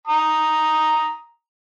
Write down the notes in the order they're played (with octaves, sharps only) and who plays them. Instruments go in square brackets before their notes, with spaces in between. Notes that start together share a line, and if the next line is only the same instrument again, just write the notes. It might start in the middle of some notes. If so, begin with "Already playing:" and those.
[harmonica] A#5 D#6